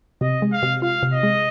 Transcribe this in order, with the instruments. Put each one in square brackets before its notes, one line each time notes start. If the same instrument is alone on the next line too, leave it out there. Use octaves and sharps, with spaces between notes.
[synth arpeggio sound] C3 [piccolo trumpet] D#5
[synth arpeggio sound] G#3
[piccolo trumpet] F5
[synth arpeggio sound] C3
[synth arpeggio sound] F4 [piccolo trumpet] F5
[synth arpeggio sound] C3
[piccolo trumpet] D#5
[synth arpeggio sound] G#3